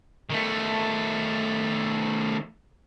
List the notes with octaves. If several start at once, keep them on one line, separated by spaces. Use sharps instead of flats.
D#3 A3